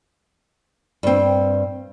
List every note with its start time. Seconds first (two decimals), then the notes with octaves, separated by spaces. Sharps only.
1.03 G2 C4